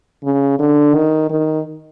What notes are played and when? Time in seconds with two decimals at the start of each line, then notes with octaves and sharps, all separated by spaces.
0.24 C#3
0.59 D3
0.95 D#3
1.30 D#3